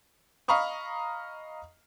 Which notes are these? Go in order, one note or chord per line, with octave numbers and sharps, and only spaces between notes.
D#5 F5 A#5 B5 C#6 D#6